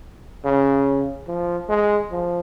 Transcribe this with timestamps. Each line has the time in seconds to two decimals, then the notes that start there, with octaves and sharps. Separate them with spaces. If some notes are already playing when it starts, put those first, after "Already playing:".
0.44 C#3
1.28 F3
1.69 G#3
2.11 F3